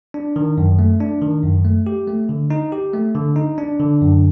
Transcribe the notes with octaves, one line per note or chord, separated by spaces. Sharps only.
D4
D#3
F#2
A3
D4
D#3
F#2
A3
G4
A3
D3
D#4
G4
A3
D3
D#4
D4
D3
F#2